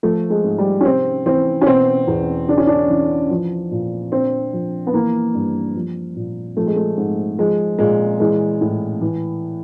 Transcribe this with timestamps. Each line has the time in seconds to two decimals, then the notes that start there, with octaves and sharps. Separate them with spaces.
0.03 F3 A3
0.30 G#3
0.44 G#2
0.58 G3
0.81 C#4
0.85 C3 C4
1.26 E3 C4
1.61 C#4
1.67 B2 C4
2.07 E2
2.48 C#3 D4
2.57 C#4
2.67 D4
2.90 E3
3.30 F3
3.71 A#2
4.11 D3 C4
4.53 F3
4.87 B3
4.93 E3 A#3
5.34 G2
5.75 F3
6.16 A#2
6.57 F3 A3
6.66 G#3
6.76 A3
6.97 G#2
7.38 F3 G#3
7.79 A#2 G#3
8.20 E3 G#3
8.61 A2
9.01 E3